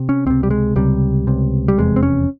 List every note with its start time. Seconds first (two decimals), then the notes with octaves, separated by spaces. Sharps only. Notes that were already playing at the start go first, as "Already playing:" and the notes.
Already playing: C3
0.09 C#4
0.26 C#2 C3 C4
0.43 G3
0.51 G#3
0.76 C#2 C3 G3
1.27 C#2 C3
1.68 G3
1.78 F1 E2 C3 G#3
1.96 C4
2.03 C#4